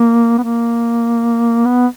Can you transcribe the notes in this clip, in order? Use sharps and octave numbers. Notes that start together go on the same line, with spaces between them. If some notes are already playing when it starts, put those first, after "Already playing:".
Already playing: A#3
B3
A#3
B3